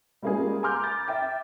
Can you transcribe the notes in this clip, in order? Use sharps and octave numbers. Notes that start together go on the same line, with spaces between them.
G3 G#3 A#3 C#4 F4 G#4
G#5 A#5 C6 D6 F6 G6
A#5 B5 A6
E5 G5 A6